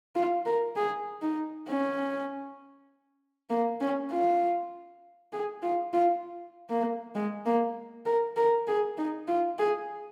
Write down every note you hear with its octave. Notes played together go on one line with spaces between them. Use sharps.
F4
A#4
G#4
D#4
C#4
A#3
C#4
F4
G#4
F4
F4
A#3
G#3
A#3
A#4
A#4
G#4
D#4
F4
G#4